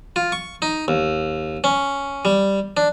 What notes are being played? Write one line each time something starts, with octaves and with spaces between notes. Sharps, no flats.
F4
C#6
D#4
D#2
C#4
G3
D4